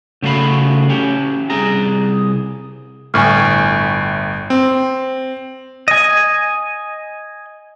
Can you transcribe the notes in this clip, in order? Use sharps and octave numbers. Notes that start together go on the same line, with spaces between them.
C#3 A3 F#4 F5 B5
C#4 G4
C2 G#4 A#5
G1 A2 G#5 C#6 F6
C4
D#5 G#5